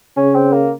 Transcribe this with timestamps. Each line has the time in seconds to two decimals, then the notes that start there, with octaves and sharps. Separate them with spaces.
0.17 C#3 C#4
0.35 C4
0.53 A#3